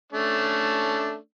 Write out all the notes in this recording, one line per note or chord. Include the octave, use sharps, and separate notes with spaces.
A3 C#4 D4